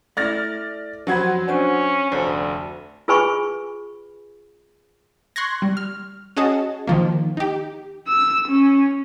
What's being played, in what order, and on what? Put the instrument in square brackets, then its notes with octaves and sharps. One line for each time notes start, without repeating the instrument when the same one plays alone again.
[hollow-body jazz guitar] A3 E4 [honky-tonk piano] D5 F6 A#6
[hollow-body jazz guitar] F2 C5 B5 [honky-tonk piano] F#3 F#5 G#6
[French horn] C#4 [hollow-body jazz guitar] D4 C5 C#5
[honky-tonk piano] F1 [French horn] D2 [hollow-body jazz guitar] C5
[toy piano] F4 G#4 B4 G#5 B5 C#6
[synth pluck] C6 C#6 F#6 G#6 A#6
G3
F6
C#4 F#4 G#4 D#5 A5
D#3 F3 A#3
D#4 G4
[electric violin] E6
C#4